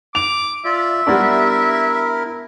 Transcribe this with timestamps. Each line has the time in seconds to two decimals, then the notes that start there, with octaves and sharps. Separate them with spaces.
0.15 D6 F7
0.65 F4 D5 E5
1.07 G3 B3 D4 E4 A#4